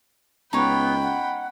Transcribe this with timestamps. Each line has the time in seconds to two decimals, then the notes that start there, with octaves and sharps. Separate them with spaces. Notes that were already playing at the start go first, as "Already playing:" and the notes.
0.53 C#2 B3 D#4 C#5 G5 B5
1.03 F#5